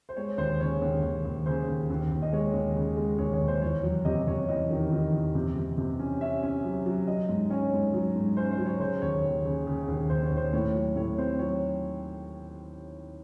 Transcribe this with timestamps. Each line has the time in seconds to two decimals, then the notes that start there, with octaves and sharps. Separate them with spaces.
0.09 C5
0.16 G#3 C#5
0.38 D#2 C5
0.60 C#3 C#5
0.82 D#2
1.03 D#2
1.25 D#2
1.46 C#3 C5
1.68 D#2
1.90 D#2
2.11 D#2
2.22 D#5
2.33 G#3 C#5
2.54 D#2
2.76 C#3
2.97 G#3
3.19 D#2 C#5
3.33 C#5
3.41 D#2
3.48 C5
3.62 E2 C#5
3.83 F#3
4.05 C3 D#5
4.27 C3 C#5
4.49 E2 D#5
4.70 D#3
4.92 D#3
5.13 E2
5.35 C3
5.56 C3
5.78 C3
5.99 C#4
6.21 C#4 E5
6.43 C#4
6.64 F#3
6.86 F#3
7.07 F#3 D#5
7.29 G#2
7.50 C#4 C#5
7.73 G#2
7.94 F#3
8.16 G#2
8.37 C#4 C5
8.52 C5
8.58 F#3
8.66 C#5
8.80 C#3 C5
9.02 D#2 C#5
9.24 D#2
9.45 C#3
9.67 C#3
9.88 D#2
10.09 D#2 C5
10.23 C#5
10.31 D#2
10.36 C5
10.53 A2 C#5
10.74 F#3
10.96 A2 C#5
11.18 C4 C5
11.39 F#3 C#5